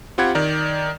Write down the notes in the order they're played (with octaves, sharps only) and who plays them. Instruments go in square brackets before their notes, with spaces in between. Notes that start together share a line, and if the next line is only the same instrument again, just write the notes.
[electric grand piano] C4 F4 G4 F#5 B5 G#6
D#3 D5 A#5